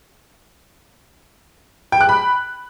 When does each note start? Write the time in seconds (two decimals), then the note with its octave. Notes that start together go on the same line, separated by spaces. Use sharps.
1.92 G5
2.01 F#6
2.09 B5